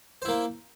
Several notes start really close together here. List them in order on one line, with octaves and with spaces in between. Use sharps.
C5 E4 A#3